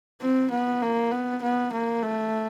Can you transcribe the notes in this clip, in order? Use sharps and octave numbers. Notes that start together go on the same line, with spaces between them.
C4
B3
A#3
B3
B3
A#3
A3